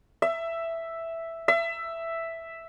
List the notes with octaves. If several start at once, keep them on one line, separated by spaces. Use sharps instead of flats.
E5
E5